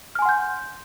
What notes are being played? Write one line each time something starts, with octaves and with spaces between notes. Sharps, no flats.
F#5 G#5 C6 F6 G6